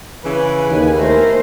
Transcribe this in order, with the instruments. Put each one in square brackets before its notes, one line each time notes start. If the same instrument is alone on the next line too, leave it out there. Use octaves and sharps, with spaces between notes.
[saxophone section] C#3 E3 [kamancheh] B4 G#5
[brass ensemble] D#2
[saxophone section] A3 [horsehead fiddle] A#4 C5